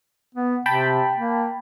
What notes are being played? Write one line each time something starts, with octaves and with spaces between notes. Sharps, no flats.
B3
C3 G5 A5 B5
A#3